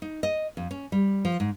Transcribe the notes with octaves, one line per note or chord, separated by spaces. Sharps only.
D#4
D#5
F2
C#4
G3
F3
G#2